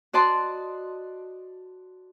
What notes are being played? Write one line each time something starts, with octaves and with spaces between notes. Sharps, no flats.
F#4 D5 D#5 A5 C6